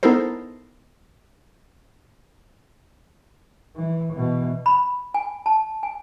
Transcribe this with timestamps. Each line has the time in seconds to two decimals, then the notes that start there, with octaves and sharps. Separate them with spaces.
0.03 B3 D#4 E4 A4 A#4 C5
3.76 E3
4.12 B2 E3
4.66 B5
5.14 G#5
5.46 A5
5.83 G#5